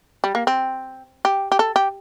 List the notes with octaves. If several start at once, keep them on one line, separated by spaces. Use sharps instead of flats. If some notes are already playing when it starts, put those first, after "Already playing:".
G3
A#3
C4
G4
G4
A4
G4